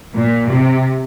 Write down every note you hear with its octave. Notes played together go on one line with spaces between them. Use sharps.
A#2
C3